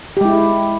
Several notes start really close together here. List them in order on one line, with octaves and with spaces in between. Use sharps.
G4 G#3 E4